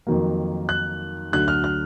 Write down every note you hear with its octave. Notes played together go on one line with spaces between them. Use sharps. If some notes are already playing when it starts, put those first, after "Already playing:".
F2 D#3 F#3 A#3
F#6
D2 D3 F#3 F#6
F6
F6